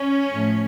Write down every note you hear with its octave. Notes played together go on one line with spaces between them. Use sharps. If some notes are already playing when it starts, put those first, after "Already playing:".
Already playing: C#4
A2 F3 A3